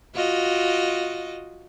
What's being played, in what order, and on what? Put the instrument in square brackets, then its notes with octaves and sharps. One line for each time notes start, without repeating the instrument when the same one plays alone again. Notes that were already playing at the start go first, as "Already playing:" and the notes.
[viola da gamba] F4 F#4 D#5